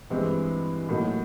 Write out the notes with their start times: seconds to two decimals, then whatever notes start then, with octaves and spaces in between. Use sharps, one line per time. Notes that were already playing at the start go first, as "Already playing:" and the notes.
0.10 G2 E3 G#3 C4
0.89 A2 F#3 A#3 D#4